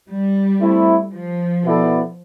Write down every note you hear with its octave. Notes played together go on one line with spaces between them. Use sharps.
G3
A3 C4 E4
F3
B2 B3 E4 A4 D5